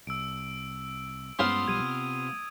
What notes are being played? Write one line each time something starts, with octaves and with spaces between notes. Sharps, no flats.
C2 E6 D7
G2 G#3 B3 C#4 F4 C5 D#6
B1 F3 G3 G#6 D#7
C3